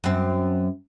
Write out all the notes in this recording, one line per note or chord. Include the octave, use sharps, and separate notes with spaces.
F#2 C4